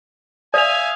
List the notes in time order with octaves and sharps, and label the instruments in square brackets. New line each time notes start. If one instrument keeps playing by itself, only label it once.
[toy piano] D5 [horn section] E5 F5 G#5 [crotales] D#6 F7